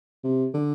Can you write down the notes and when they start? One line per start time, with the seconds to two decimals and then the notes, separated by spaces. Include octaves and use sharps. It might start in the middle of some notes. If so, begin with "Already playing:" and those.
0.24 C3
0.54 D3